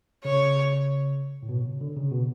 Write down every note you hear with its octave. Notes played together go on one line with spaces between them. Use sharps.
C#3 C#5
A2
B2
C#3
D3
C#3
B2